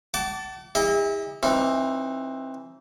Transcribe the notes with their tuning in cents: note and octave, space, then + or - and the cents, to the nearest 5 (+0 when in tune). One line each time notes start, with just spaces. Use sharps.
F#5 +45 A5 +0 D6 -30
E4 -30 G#4 -45 D#5 +0
E3 +0 C4 +20 D#4 +0